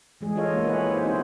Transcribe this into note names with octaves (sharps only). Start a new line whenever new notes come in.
E3 G#3 G#4
D4 F4 A4 C#5 D#5 F5
A#3 B3
E4 G4 G#4 B4 C#5 F#5
D#4 G#4 C5
B3 C4 E4 F#4 C5